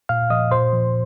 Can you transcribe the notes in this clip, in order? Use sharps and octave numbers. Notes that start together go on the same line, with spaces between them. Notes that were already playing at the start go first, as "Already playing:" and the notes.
A#2 F5 F6
F3 D#5 D#6
A#2 C5 C6
F3